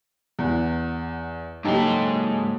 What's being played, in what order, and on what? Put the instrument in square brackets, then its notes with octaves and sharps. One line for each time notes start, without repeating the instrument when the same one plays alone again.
[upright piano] E2 [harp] F#5
[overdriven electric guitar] G#2 C6 [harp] C#3 F#3 A#3 [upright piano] D#4 G4 A4